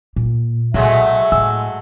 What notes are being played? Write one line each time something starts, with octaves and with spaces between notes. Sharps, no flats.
A#2 A#3
B1 F#3 G#3 A3 E5
A2 G#5 E6